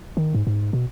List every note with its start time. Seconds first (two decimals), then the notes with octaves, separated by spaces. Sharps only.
0.17 D#3
0.35 G#2
0.47 G#2
0.73 B2